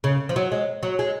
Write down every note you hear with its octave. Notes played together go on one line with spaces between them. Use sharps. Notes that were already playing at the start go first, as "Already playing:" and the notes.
C#3
F3
F#3
G#3
F#3
G#3